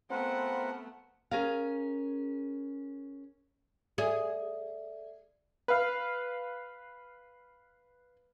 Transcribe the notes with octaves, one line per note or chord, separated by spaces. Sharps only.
A3 B3 C4 F4 A#4 B4 F#5
C#4 G#4 A#4 F5
G#4 A4 D5 E5
B4 F5